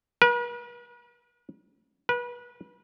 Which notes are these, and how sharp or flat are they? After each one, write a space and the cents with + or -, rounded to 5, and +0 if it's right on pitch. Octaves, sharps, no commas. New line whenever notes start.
B4 -45
B4 -30